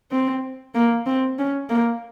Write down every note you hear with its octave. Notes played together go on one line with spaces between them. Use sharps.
C4
A#3
C4
C#4
A#3